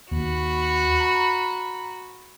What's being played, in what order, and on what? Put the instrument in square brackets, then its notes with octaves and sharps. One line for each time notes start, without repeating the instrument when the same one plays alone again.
[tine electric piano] D#2 [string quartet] F#4 B5
[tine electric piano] A#5